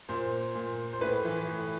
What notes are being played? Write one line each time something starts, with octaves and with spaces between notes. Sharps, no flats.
A#2 C5
A#2
C5
A2 B4
E3
A2